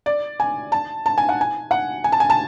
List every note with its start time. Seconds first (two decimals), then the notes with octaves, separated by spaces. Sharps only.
0.06 D5
0.40 G#5
0.72 A5
1.06 A5
1.18 G#5
1.29 F#5
1.41 G#5
1.71 F#5
2.04 G#5
2.12 A5
2.20 G#5
2.30 A5